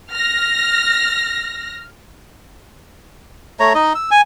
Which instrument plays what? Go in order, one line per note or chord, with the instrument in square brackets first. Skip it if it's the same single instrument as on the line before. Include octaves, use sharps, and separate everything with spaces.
[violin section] F6 A#6
[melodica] A3 C#5 A#5
D#4 D#5
E6
G#5